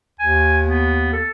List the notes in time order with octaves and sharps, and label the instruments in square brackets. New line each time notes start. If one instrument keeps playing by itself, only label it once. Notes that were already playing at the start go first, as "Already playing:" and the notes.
[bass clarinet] D#2 [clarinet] G#5
[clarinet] B3
A4